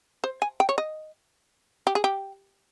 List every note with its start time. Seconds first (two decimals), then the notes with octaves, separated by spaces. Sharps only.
0.24 C5
0.42 G#5
0.60 G5
0.69 C#5
0.78 D#5
1.87 G4
1.95 G#4
2.04 G4